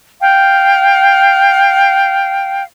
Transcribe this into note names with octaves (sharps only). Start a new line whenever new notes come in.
F5 G5